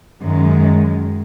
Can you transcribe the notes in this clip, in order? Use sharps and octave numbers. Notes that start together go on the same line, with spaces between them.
F#2 D#3 G#3